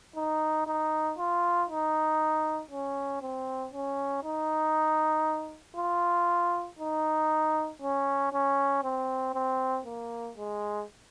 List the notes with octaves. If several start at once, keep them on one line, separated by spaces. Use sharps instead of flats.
D#4
D#4
F4
D#4
C#4
C4
C#4
D#4
F4
D#4
C#4
C#4
C4
C4
A#3
G#3